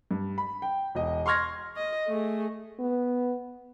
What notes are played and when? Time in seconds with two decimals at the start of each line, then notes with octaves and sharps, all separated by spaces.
0.11 G2
0.38 B5
0.62 G5
0.95 E1 D#5
1.26 C6 C#6 F6 G#6 A#6
1.76 D#5
2.08 A3 G#4
2.79 B3